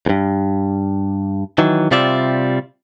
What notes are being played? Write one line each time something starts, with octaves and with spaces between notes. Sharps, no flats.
E2 G2
D#3 E3 F#3
C3 G3 F4 D5 E5